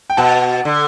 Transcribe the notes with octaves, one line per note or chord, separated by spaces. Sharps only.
G5
B2 F#5 A5
D3